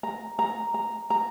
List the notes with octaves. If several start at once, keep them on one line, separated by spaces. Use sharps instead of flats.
A#5
A#5
A#5
A#5